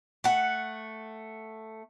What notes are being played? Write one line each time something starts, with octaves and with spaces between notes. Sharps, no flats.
A3 F#5